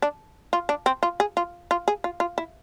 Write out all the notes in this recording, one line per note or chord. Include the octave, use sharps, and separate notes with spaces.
D4
F4
D4
C4
F4
G#4
F4
F4
G#4
F4
F4
E4